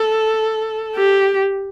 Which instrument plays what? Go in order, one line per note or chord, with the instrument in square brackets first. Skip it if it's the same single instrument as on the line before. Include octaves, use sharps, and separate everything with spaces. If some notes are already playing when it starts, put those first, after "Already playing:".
Already playing: [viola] A4
G4